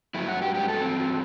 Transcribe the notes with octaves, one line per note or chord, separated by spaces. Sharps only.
G2 F#3 E4
F#4
G4
G4
A4
C4